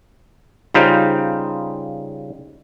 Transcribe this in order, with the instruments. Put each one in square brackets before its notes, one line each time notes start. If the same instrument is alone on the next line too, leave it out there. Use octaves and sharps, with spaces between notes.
[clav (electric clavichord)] C#3 G3 D#4 F4 C5